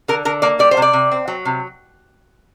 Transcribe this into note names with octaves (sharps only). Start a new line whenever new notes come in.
D3 A#4
D3 A#4
A#3 D5
G3 D5
C5
C3
D5
C3
C4
F#3
C3